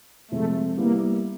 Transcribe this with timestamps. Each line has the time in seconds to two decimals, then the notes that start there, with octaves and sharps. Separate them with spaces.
0.31 C3 F3 G#3 A3
0.78 G3 A#3 B3 E4